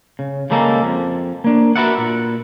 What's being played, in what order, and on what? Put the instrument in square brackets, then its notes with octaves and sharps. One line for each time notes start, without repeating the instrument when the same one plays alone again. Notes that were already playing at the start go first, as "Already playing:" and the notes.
[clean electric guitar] C#3
C#3 G3 G#3 A#3 A4
F2
A#3 D4
F#4 A#4 B4 D5 E5 F#5
A#2